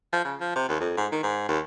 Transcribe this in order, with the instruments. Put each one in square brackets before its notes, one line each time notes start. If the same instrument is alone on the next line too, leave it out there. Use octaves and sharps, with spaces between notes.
[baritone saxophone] F3
C#3
F3
C3
D#2
F2
G#2
D#3
G#2
D#2